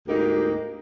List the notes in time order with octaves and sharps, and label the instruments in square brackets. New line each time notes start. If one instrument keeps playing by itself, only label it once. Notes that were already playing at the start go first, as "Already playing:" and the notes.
[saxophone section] D2 G#2 A#3 D#4 G4